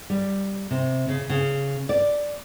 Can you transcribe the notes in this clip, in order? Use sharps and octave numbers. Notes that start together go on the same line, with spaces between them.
G3
C3
C#3
C#3
D5